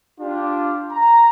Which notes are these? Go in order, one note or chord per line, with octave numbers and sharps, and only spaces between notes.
D4 F4 G4
A#5